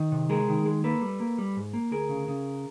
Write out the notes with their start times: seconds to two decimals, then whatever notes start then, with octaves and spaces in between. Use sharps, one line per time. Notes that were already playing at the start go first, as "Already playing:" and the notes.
Already playing: D#3
0.12 C3
0.29 G#3 G#4 A#4
0.48 D#3
0.66 G#3
0.84 A#3 A4 B4
1.01 G3
1.20 A#3
1.38 G3
1.56 G#2
1.73 A#3
1.91 D2 G#4 A#4
2.09 C#3
2.28 C#3